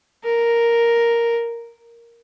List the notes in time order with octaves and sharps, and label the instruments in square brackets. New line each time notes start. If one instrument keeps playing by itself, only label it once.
[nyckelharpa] A#4